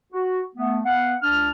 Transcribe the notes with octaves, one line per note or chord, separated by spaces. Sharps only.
F#4
A3 B3
B3 F5 F#5
C#2 D4 A5 F6